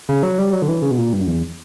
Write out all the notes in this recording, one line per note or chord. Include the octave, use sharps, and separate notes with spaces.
C#3
F#3
G3
F#3
D3
E3
C#3
B2
A#2
G2
F#2
E2